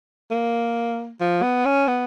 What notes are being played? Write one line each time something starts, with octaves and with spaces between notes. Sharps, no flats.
A#3
F3
B3
C#4
B3